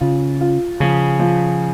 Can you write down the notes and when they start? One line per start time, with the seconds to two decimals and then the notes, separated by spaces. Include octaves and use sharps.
0.01 C#3 F4
0.41 F4
0.80 C#3 F3
1.19 F3